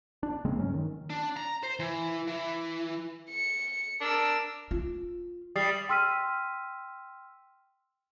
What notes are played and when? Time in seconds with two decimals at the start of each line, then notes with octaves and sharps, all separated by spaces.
0.23 D4
0.45 C#3 G#3 A#3 C4
0.59 G2 F#3 C#4
0.74 D#3
1.10 D4
1.37 A#5
1.63 C5
1.79 E3
2.27 E3
3.30 C#7
4.00 D4 A#4 E6
4.71 F4
5.56 G3 D#6 A6 C7
5.89 G5 C6 E6 F6 B6 D#7